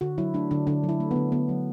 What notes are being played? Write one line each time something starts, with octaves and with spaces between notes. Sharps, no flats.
D3 F#4
F#3 E4
A3 D4
D3 D4
D3 D4
F#3
E4
A3
D3 B3
D3 B3
F#3